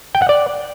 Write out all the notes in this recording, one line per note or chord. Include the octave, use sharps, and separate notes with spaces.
G5
F#5
D5